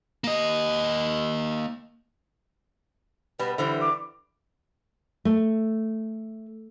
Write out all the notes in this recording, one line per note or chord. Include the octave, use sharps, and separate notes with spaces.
A#3 D#5
B2 G3 B4
D3 E3 G3 C5
D6
A3